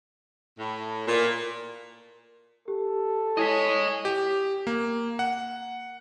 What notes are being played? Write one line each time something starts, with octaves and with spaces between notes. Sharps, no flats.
A2
A#2
G4 A4
E4 C#5 D#5 G#5 B6
G4
A#3
F#5